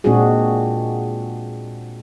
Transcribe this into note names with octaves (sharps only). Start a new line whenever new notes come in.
A#2 G#3 C4 D4 F#4 G#4